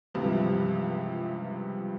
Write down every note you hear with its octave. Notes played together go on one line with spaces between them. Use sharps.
C#2 G2 C3 E3 F3